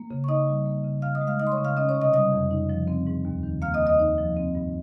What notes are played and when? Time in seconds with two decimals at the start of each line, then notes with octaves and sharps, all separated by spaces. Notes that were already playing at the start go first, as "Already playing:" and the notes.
Already playing: A#3
0.11 C#3
0.24 C#6
0.28 D#4 D#5 D#6
0.48 G3
0.66 A#3
0.84 C#3
1.02 C#3 F5 F6
1.15 D#5 D#6
1.21 G#3
1.27 F5 F6
1.40 D#4 D#5 D#6
1.47 C6
1.52 C#5 C#6
1.58 C#3
1.65 F5 F6
1.77 C#4 D#5 D#6
1.89 C#5 C#6
1.95 C3
2.01 D#5 D#6
2.13 G3 D#5 D#6
2.32 F2
2.51 D#4
2.69 F3
2.88 C4
3.07 G#2
3.25 D#2
3.43 D#3
3.62 A#3 F5 F6
3.74 D#5 D#6
3.81 D#2
3.86 D#5 D#6
3.99 D#4
4.18 F3
4.36 C4
4.55 G2